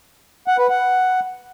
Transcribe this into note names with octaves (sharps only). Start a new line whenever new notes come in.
F#5
B4
F#5